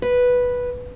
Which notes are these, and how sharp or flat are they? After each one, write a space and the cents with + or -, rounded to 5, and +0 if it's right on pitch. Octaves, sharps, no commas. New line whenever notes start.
B4 -5